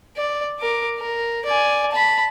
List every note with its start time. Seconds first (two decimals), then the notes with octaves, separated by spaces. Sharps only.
0.17 D5
0.60 A#4 D6
0.99 A#4
1.45 D5 G#5
1.92 A5 B5